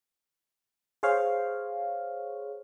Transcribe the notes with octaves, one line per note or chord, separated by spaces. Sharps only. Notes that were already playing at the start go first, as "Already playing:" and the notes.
G#4 C5 C#5 F5